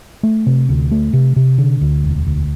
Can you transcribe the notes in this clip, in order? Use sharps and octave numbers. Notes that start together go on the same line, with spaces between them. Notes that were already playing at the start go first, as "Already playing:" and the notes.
A3
C3
D2
A3
C3
C3
D3
D2
E1
D2